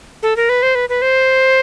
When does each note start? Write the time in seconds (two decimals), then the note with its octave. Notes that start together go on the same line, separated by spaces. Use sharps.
0.23 A4
0.36 A#4
0.49 B4
0.63 C5
0.75 B4
0.89 B4
1.02 C5